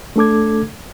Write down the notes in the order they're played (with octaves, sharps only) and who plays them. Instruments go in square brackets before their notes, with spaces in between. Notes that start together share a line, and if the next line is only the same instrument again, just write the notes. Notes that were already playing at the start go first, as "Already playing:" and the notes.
[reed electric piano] A3 D4 A4 D6 G#6